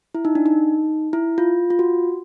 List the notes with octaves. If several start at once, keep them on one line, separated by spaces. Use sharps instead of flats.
E4
D#4
D4
D#4
E4
F4
F4
F#4